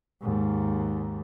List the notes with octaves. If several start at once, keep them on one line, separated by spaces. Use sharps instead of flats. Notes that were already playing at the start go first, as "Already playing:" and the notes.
D#2 G#2